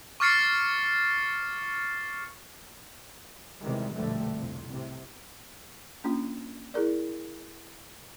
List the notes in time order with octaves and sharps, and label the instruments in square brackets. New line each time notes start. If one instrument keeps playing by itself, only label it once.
[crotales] C#6 D6 F6 A6 C7 C#7
[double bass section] E2 C3 D#3 E3 G3 G#3
F1 A#1 B2 D3 G3 A3
C2 F2
A2 C3
[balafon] A#3 C#4 D4 F4
E4 G#4 A#4 D5